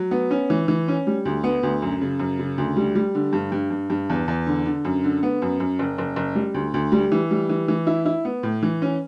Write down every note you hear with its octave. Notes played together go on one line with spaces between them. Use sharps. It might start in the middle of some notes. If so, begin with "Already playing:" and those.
Already playing: F#3
B3
C#4
E3
E3
C#4
G3
D2
B3
D2
F#2
C#3
F#2
C#3
D2
G3
G3
D3
G2
G2
G2
G2
E2
E2
D3
D3
F#2
D3
B3
F#2
F#2
F#1
F#1
F#1
G3
D2
D2
G3
E3
G3
E3
E3
E4
E4
B3
A2
E3
C#4